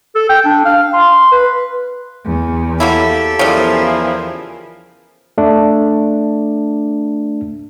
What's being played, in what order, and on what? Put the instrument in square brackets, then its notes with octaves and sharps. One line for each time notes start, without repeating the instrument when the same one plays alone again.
[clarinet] A4
G5
D4
F5
C6
B4
[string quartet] E2
[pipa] F#3 A#3 E4 [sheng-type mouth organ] G4 A4
[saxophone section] E2 F3 [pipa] C#3 G3 [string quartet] E4 G#4 A#4
[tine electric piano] A3 D4